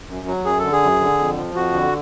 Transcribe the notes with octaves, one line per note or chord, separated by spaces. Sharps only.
F#2
F#3
F#2 G#4
D3 A4
G#4
F#2
D3
F2
F3
F2 F#4
D3